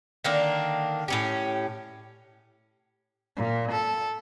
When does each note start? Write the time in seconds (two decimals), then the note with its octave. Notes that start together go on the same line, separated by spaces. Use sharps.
0.24 D3 D#3 A#3 D4
1.08 A2 C#4 G4
3.35 A#2
3.71 A4